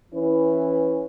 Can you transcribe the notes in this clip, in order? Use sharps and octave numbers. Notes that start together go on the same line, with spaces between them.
E3 C#4 E4 B4